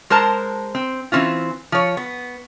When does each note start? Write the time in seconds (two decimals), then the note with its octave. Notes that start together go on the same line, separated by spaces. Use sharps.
0.10 G#3 A#4 C5 A5 A#5
0.75 C4
1.12 E3 C4 C#4 F4
1.72 F3 C#5
1.97 B3